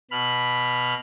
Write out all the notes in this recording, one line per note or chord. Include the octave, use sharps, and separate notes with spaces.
B2 B5 F6